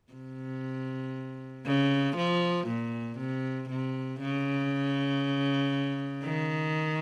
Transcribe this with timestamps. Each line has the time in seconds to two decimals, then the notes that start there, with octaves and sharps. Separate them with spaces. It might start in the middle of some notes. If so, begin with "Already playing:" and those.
0.13 C3
1.66 C#3
2.17 F3
2.67 A#2
3.18 C3
3.69 C3
4.20 C#3
6.24 D#3